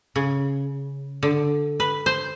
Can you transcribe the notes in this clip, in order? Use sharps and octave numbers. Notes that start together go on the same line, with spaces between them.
C#3
D3
B4
C5